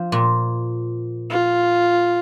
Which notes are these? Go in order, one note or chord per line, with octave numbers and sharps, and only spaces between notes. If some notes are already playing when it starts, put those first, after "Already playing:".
Already playing: F3
A#2
F4